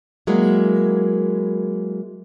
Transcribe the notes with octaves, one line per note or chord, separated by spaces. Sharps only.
F#3 G#3 A#3 E4